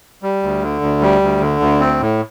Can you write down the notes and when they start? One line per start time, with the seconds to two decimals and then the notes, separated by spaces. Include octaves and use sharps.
0.23 G3
0.42 D2
0.62 D3
0.81 D2
1.02 G3
1.21 D2
1.41 D3
1.60 D2
1.80 C4
2.00 A2